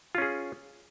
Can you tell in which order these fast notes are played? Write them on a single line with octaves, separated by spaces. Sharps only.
F4 C#4 G#4